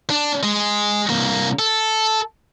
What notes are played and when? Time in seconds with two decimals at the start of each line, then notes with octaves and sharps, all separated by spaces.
0.10 D4
0.43 G#3
1.10 C2 A#3
1.59 A4